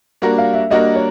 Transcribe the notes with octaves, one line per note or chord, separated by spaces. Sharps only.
G3 A#3 D4 F#4 A#4
F5
E5
G3 A#3 D4 F#4 A#4 D#5
C#5